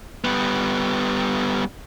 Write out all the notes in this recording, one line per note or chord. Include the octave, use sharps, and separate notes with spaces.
G3 B3